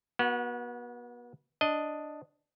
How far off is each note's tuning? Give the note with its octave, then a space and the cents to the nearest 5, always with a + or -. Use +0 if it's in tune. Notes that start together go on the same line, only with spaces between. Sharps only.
B3 -35 F#4 +0
D4 +0 D#5 +0